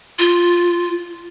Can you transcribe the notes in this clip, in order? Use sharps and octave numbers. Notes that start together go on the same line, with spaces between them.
F4